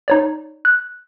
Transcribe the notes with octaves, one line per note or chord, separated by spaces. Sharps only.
D#4 C#5 D5
F#6